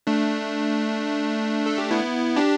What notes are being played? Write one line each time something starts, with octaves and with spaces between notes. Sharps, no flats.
A3 D4
A4
G4
B3 E4
D4 G4